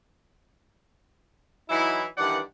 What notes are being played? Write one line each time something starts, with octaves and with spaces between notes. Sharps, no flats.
E3 F#3 D#4 E4
G2 D#3 E3 D5 F#5